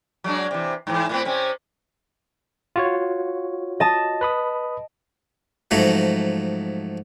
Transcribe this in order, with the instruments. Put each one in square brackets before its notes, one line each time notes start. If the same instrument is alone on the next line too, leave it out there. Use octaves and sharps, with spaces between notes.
[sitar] F#3 G#3 D4
C3 E3
G#2 E3
A2 B3 C4
C3 C4 C#4
[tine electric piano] F4 F#4 C#5
[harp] D#5 A5
[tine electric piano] B4 B5 D#6
[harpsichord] G#2 F3 F#3 A3